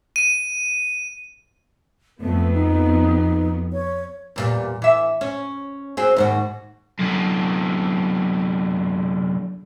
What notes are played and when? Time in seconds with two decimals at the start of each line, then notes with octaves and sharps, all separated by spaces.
0.16 D#7
2.20 F2 A3 B3
2.54 D#4
3.73 C#5
4.36 E2 A#2 G3
4.82 E3 E5
5.21 C#4
5.97 C4 F#4 G#4
6.16 D#2 G#2 F#4
6.99 F#2 D3